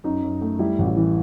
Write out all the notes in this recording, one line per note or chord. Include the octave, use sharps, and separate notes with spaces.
F#2 D#4
F#2
A3
G3 E4
A1
E4
E3